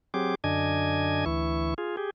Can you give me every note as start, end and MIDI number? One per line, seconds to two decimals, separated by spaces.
0.14 0.35 54
0.14 0.35 60
0.14 0.35 67
0.14 0.35 68
0.14 0.35 86
0.44 1.25 42
0.44 1.25 50
0.44 1.25 62
0.44 1.25 75
0.44 1.25 80
0.44 1.25 92
1.26 1.74 38
1.26 1.74 52
1.26 1.74 64
1.26 1.74 85
1.78 1.96 65
1.78 1.96 68
1.97 2.10 67
1.97 2.10 68